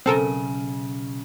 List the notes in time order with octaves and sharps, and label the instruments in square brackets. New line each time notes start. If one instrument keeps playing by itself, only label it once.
[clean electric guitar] B1 C#3 [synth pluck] C4 A4 A#4